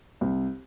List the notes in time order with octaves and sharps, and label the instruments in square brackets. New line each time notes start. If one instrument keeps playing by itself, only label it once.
[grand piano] C2